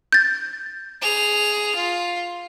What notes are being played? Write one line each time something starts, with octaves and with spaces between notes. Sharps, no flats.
G6 A6
G#4 F7
F4